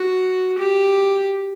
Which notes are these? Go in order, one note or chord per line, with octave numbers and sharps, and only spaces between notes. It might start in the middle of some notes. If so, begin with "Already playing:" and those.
Already playing: F#4
G4